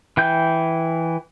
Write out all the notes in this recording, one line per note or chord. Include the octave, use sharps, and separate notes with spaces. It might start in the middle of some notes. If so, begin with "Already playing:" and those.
E3 G5 G6